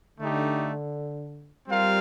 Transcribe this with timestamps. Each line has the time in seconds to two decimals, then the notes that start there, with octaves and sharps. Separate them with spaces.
0.19 D3 A3 D#4 G4
1.68 G3 C4 F4 A#4 F5